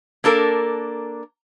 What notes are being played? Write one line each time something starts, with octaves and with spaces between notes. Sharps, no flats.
A#3 D4 A4 A#4